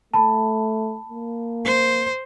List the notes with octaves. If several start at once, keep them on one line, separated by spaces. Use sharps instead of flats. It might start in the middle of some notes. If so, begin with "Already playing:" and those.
A3 A5 B5
A#3
C5